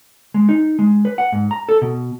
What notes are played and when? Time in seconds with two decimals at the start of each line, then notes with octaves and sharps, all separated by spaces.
0.34 G#3
0.49 D#4
0.79 G#3
1.05 B4
1.18 F#5
1.32 G#2
1.51 A#5
1.69 A4
1.82 B2